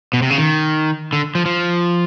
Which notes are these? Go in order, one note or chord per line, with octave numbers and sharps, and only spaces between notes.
B2
C3
C#3
D#3
D3
F3
F3